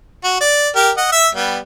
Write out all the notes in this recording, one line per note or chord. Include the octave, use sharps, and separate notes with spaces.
F#4
D5
G4 A#4
D#5 F#5
E5 E6
G3 B3